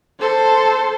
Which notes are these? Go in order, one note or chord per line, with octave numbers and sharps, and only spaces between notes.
A4 C5